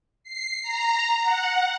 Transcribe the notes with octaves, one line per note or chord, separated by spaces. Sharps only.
C7
A#5
F#5